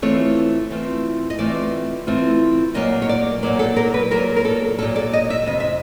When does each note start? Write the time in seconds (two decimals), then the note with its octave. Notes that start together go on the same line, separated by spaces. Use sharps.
0.02 E3 A3 C4 F4 C#5
0.71 E3 A3 C4 F4
1.30 D#5
1.39 E3 A3 C4 F4 D5
2.07 E3 A3 C4 F4
2.74 A#2 F#3 A#3 D#5
3.02 C#5
3.09 D5
3.43 A#2 F#3 A#3 D5
3.59 A4
3.76 A#4
3.94 B4
4.11 A#2 F#3 A#3 A#4
4.36 A#4
4.45 A4
4.79 A#2 F#3 A#3 A4
4.96 D5
5.13 D#5
5.30 E5
5.46 F2 C3 D#5
5.60 E5